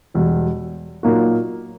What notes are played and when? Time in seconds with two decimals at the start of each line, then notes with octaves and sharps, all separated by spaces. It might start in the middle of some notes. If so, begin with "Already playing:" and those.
0.14 E1 E2 B2 G3
1.03 A#2 F#3 A#3 D#4 F#4